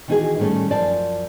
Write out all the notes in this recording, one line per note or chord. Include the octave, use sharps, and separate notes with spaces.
D#3 E3 D#4 F4 F#4 G#4
A2 D#3 G3 A3 C#4
F#2 F3 D5 F5 A5